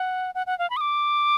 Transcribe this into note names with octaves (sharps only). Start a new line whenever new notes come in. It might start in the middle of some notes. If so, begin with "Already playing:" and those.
Already playing: F#5
F#5
F#5
F5
B5
D#6
D6